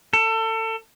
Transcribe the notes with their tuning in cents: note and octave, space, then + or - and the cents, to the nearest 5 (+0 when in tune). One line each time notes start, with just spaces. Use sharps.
A4 +30